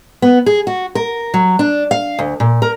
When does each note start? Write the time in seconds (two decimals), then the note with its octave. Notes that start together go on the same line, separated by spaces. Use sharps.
0.22 B3
0.46 G#4
0.67 F#4
0.95 A#4
1.34 F#3
1.59 D4
1.91 F5
2.19 D2
2.40 A#2
2.62 A#4